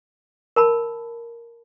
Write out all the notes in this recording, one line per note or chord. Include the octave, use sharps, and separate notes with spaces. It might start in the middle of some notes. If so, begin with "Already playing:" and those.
A#4 A5 B5